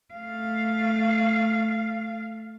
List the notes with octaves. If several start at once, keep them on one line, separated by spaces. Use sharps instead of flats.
A3 F5